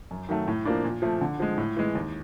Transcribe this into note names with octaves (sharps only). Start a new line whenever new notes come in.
F#2
D#3 F#3 A3
A2
F3 A#3 D4
A#2
F3 A3
D3
F3 G#3
A2
E3 G#3
D#2